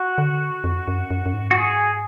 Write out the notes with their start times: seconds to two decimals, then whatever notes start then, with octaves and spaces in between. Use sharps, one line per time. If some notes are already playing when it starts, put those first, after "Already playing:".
Already playing: F#4
0.18 D3
0.64 F2
0.88 F#2
1.11 F#2
1.26 F#2
1.33 G#2
1.51 F#4
1.58 G#4